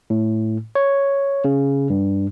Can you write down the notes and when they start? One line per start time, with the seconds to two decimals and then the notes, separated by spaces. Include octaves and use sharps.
0.10 A2
0.75 C#5
1.44 C#3
1.90 G2